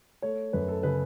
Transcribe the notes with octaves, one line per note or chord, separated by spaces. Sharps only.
A3 C#5
F#2 B4
A4
C#3 B4